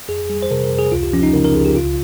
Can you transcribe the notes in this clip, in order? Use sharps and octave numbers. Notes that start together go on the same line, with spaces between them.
F2 G#4
G3 G#4
C5
C3 A#4
A#4
F2
G#4
C#2 F4
G4
F3 C#4
D#4
C#3 A#4
A#4
C#2 G#4
G4
C2 F4